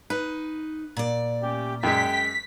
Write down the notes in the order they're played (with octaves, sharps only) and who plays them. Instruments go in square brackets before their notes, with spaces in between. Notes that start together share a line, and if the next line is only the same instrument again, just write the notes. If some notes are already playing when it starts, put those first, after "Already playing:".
[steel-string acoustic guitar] D#4 [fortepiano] B4
[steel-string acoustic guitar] A#2 D5
[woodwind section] A3 C#4 G4
[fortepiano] F#2 G#3 [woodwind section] G5 [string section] B6